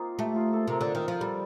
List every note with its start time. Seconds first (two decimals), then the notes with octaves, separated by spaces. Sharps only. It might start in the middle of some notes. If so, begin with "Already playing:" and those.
Already playing: A#3 C4 D#4 F4
0.19 A3 G4
0.36 F4
0.53 A4
0.67 C3 A#4
0.81 D3
0.95 D#3
1.08 F3
1.21 G3 A4